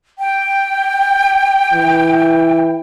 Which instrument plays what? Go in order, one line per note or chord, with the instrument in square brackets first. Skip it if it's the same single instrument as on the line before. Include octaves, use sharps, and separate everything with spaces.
[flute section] G5
[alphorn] E3